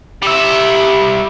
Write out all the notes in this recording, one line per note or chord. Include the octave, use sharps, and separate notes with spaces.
G3 E5